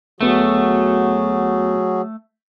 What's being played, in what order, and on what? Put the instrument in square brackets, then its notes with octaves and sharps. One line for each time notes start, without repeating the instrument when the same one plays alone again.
[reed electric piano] D2 B3 [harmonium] F#3 F#4 G#4 [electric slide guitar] A3